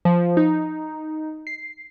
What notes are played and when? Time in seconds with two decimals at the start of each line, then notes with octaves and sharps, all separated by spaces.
0.05 F3
0.37 D#4
1.47 C7